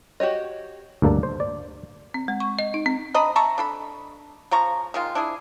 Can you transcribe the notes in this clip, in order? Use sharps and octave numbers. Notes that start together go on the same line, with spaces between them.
F#4 G4 C#5 D#5
D2 G2 A#3 A4 D5
C5
D5
C4
G#3
C#6
D#5
D#4
C4
D4 D#5 A#5 B5
E5 A5 A#5 C#6
D4 A4 B5
C#3 F3 A#5 C#6
D#3 G#3 F4
D4 E4 G#4